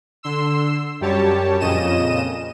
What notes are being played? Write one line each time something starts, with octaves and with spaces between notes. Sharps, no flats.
D3 C6 E6
F#2 G3 G4 C#5 A5
F2 A#2 C#3 D#5 D#7 E7